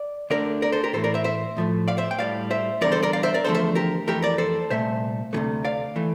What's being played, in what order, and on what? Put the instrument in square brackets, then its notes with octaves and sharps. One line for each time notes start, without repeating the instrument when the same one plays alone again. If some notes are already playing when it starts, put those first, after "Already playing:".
Already playing: [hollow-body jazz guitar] D5
D2 D3 A3 A#4 D5
A#4 D5
A4 C5
G4 A#4
A2 E3 A3 A4 C5
A#4 D5
C5 E5
C5 E5
A2 F3 A3
D5 F5
C5 E5
G5
A2 G3 D5 F5
C5 E5
E2 D3 G3 A#4 D5
A4 C5
A#4 D5
D5 F5
C5 E5
A#4 D5
E2 D3 F3 A3 A4 C5
C5 E5
G4 A#4
F2 E3 A3 G4 A#4
A#4 D5
A4 C5
C2 A#2 A3 C5 E5
D2 C3 E3 A3
D5 F5
E3 A3